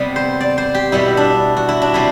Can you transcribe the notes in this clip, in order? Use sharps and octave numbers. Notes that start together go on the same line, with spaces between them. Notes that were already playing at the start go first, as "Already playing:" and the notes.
Already playing: C3 G3 B3
C5
D5
C5
G4
B2 G3 B3 E4
D4
F#4
E4
D4
C3 G3 E4